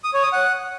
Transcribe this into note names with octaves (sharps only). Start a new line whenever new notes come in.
D#6
C#5
D#6
F#5